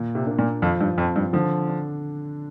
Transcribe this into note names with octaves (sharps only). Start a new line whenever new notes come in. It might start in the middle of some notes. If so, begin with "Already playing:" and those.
Already playing: A#2
C3
A#3 D4
A#2
F2 F3
G2
F2 C4
G2
D3 F3
D4